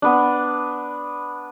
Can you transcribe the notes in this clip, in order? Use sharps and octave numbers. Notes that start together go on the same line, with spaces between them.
B3 D4